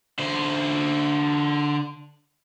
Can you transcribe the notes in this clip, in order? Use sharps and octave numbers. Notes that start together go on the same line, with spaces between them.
D3 C5